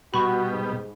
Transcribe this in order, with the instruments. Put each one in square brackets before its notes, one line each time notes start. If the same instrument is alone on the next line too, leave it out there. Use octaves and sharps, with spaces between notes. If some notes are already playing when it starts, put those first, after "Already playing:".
[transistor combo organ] B2 G3 [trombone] F#4 [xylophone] B5 C#6
[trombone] G#2